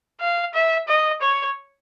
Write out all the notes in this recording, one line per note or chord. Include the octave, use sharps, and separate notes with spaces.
F5
E5
D#5
C#5